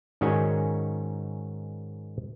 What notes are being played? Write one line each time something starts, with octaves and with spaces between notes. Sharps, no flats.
G#2 D#3 C#4 F#4 D5 G#5